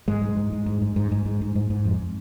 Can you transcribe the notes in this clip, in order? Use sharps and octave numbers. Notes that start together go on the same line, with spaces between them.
G#2 G#3
G#2
G#2
G#2
G#2
G#2
G#2
G#2
G#2
G#2
G#2
G#2
F2